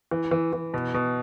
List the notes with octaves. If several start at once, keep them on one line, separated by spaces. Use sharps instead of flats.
E3
E3
E3
B2
B2